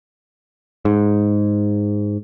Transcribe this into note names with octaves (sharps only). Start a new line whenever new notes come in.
G#2